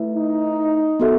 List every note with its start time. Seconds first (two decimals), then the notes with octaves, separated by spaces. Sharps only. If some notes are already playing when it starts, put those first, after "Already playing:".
Already playing: A3 E4 B4 E5
0.15 D#4
1.00 B3 F#4 A4 E5